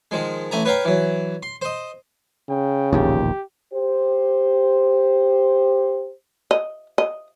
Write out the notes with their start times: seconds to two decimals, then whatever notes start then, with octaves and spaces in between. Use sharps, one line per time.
0.11 D#3 F3 G#3
0.51 A1 A3 G#5 A#5
0.65 B4 C#5 F5 G5 A#5
0.85 E3 F#3
1.43 C6
1.62 C5 D#5
2.49 C#3 G5
2.93 E1 A#1 D#2 G4
3.73 G4 C5
6.51 D#5
6.98 D#5